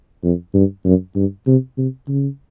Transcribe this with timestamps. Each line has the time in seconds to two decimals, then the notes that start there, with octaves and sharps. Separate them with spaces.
0.23 F2
0.54 G2
0.84 F#2
1.15 G2
1.47 C3
1.77 C3
2.08 C#3